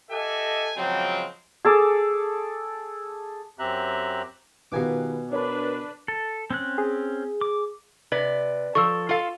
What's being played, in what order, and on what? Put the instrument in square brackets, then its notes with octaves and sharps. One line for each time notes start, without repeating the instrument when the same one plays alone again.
[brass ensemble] G4 A4 D#5 E5 F#5 G#5
C#3 F3 F#3 G#3 C4
[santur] G#4 A4 D6
[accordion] F#2 C4 G4 E5 A#5 F#6
[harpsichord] B2 G#5 D6 [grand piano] D#3 F4 G4 [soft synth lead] B4
[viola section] D4 B4 [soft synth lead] A#4 [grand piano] C#5 B5
[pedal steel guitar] A4
C4 C#4 F#6
[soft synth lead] G#4
[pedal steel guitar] D6
[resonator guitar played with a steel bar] C3 B4 D5
[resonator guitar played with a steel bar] F3 A4 [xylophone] C#6 E6
[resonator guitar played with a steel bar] F4 A4 F5